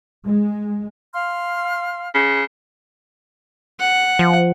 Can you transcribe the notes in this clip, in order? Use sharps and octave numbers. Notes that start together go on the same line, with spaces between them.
G#3
F5 C6 F6
C#3
F#5
F3